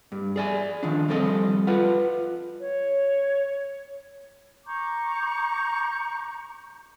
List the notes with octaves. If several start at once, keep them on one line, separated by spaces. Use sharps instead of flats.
G2
G#4 D5 G#5
D#3 F3 D4
F3 G3 C4 A4 D#5
F4 B4 F#5
C#5
A#5 C#6 D6 G6